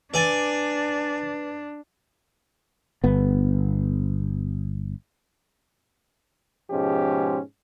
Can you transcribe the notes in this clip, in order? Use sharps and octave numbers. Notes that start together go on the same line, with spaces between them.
D4 B4 D5 G#5 A6
G1 B3
G#2 B2 F3 G#3 C#4 G4